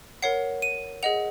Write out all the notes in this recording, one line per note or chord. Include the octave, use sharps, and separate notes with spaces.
A#4 C#5 F#5 C7
D#7
G#4 D#5 F#5 F7